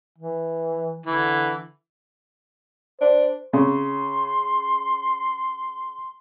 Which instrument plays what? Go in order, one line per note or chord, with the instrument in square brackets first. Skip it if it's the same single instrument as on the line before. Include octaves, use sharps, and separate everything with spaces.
[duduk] E3
[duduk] D3 [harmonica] E3
[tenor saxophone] D4 [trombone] C5
[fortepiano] C#3 [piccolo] C6